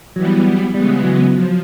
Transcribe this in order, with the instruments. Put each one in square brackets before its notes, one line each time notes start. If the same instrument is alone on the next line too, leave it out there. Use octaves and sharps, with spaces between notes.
[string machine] E3 G3 B3 [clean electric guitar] F#3
[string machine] C#3 E3 G#3 B3 [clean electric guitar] G3
[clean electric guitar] F#3
[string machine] F3